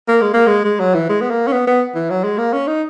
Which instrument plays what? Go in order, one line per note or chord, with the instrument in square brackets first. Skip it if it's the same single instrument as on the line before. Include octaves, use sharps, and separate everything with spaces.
[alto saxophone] A#3
G#3
A#3
G#3
G#3
F#3
E3
G#3
B3
A#3
C#4
B3
B3
E3
F#3
G#3
A#3
C#4
D#4